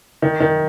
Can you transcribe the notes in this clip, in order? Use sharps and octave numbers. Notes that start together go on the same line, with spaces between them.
D#3
D#3